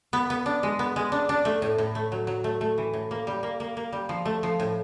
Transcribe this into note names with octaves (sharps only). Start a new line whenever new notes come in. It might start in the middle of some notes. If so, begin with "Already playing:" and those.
B3
B3
D4
G#3
B3
G#3
D4
D4
A3
A2
A2
A3
F#3
F#3
A3
A3
E3
A2
A#3
G3
A#3
A#3
A#3
G3
F3
A3
F3
A2